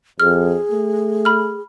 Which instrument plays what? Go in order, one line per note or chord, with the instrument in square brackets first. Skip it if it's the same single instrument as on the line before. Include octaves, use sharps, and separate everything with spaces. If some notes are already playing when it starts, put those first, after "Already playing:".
[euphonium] F2 [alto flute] G#4 [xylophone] F6
[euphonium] A3
[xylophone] B5 F6